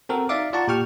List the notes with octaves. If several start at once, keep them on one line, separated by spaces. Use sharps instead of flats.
C4 F#4 A4 A#4
D#4 D5 E5 F5 D6
F4 D5 F#5 A5 A#5 C#6
A#2 G4 G5 C#6 F6